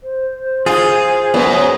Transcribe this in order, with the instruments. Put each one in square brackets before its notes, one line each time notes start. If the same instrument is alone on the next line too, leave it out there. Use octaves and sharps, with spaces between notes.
[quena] C5
[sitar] F4 [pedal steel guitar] G#4
[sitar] F#2 [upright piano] B3